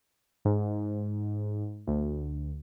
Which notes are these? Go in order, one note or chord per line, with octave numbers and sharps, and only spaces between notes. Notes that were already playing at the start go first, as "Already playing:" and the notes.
G#2
D2